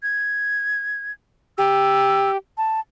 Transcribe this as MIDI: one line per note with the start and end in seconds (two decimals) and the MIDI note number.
0.03 1.12 92
1.58 2.37 67
1.58 2.31 88
2.58 2.80 81